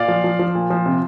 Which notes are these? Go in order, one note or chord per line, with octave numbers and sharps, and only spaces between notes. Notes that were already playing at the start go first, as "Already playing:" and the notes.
Already playing: A#2 D5 F5
F3
F3
F3
A#2
F3
C3